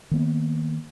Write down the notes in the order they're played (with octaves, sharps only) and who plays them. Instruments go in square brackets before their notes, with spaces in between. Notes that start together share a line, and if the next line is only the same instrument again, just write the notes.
[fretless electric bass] D#3 A#3 B3